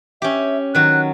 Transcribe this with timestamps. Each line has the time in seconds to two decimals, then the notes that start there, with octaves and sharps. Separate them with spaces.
0.22 C#4 G4 E5
0.75 D#3 F#3 F#6